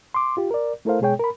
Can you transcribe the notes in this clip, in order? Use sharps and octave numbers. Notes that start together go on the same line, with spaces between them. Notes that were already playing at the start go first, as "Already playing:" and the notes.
C6 D6
F4 G4
A#4 D5
A3 E4 A4 A#4 C5 F5
B2 G#3 G#4 C#5 G5
A#4 B5